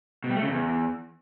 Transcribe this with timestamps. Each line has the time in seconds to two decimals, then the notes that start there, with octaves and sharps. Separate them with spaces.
0.24 B2
0.30 G3
0.36 A3
0.42 C#3
0.48 E2